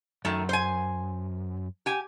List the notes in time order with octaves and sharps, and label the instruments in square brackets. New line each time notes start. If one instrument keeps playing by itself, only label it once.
[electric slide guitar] F#2 [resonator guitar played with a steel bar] D#3 A3
[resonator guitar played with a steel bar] C5 G#5
G4 G#5